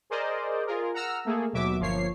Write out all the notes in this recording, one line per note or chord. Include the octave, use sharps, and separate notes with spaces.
G#4 A#4 C5 D5 D#5
F4 G#4 A#4
F#5 A#5 E6 F6
A3 A#3 G#4 A4
D#2 B2 F#3 E5 D6
G1 F3 A#3 C#5 C7